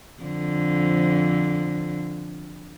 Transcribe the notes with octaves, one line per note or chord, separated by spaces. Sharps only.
F2 D3